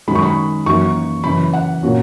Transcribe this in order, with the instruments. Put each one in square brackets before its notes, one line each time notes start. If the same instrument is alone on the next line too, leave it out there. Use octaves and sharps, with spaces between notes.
[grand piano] F#2 D#3 G#3 D#4 F#4 [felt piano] B5
[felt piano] C#6
B5
[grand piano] F#2 E3 A#3 D#4 F#4 [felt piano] C#6
[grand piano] F#2 C#3 E3 [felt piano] B5
[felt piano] F#5
[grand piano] A#2 A#3 C#4 F#4